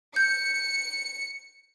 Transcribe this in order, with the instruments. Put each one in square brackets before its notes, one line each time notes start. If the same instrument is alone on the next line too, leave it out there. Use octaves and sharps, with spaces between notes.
[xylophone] G6 [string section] C#7